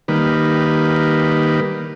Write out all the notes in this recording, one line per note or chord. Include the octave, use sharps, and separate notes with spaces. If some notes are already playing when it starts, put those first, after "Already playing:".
D#3 G3 A#3 B4